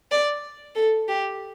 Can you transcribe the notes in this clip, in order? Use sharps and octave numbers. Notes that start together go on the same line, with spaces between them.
D5
A4
G4